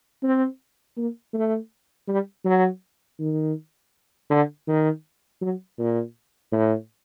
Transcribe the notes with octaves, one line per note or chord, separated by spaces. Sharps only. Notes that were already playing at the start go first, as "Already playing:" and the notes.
C4
A#3
A3
G3
F#3
D#3
D3
D#3
F#3
A#2
A2